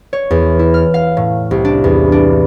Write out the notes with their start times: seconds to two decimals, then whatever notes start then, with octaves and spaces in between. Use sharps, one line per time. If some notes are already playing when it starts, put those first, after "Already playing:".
0.13 C#5
0.31 E2
0.59 E4
0.74 F6
0.94 F5
1.17 A2
1.51 C2
1.65 D4
1.84 E2
2.12 D4